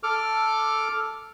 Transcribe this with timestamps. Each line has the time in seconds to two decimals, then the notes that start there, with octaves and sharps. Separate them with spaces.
0.03 A4 D6 F6